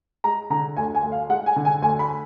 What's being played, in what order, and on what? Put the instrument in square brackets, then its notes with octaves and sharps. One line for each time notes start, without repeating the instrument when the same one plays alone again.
[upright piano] G#3 A#5
D3 A#5
D2 G#5
G#5
D2
F5
G#3 F#5
G#5
D3
G#5
D2 G#5
B5